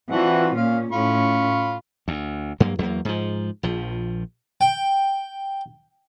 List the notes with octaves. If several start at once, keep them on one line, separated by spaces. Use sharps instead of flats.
E3 C4 D4 F4 F#4 F#5
A#2 C#4 F5
A2 C#4 F4 B5 C#6
D2
G2 F#3 A#3
E2 F#3 G3 A#3
G#2 F3
A#1 F3
G5